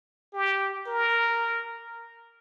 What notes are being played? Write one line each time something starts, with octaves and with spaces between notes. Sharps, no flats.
G4
A#4